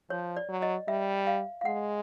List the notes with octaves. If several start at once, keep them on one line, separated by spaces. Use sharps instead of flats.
F3 C#5
D5
F#3
D#5
G3 E5
F5
F5
G#3 F#5